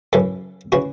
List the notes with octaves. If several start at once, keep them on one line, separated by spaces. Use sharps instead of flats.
F#2 C#3 E3 A4
C#3 E3 F#4